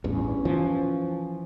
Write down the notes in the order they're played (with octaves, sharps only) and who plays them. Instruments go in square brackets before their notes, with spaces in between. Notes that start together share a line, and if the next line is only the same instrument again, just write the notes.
[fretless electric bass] A1 E2 G2 [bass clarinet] C#4
[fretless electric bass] E3 F3